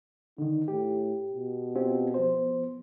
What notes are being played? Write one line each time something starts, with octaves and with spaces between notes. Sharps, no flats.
D3 D#3 D#4
A2 G4
B2
C4 F4 G4
F3 B3 C5